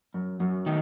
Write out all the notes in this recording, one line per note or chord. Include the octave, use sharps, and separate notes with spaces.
F#2
F#2
D#3